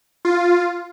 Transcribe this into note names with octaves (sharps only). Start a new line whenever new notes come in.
F4